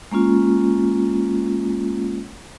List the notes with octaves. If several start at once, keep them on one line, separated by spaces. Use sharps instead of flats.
G#3 A#3 C#4 F4